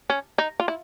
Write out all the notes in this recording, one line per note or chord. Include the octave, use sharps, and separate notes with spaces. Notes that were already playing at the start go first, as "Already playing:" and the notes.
C#4
D#4
F4
E4